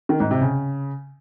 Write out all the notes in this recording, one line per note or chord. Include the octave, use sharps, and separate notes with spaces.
D#3
G#2
C3
C#3